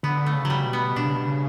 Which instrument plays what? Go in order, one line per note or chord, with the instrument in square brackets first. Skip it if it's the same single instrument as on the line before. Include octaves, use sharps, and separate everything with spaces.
[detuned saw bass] D3 [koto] B3
[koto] A3
[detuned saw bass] C#3
[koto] F#3
G3
[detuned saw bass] B2
[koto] B3
[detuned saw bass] B2 [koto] D4
[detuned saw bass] C#3
B2
C#3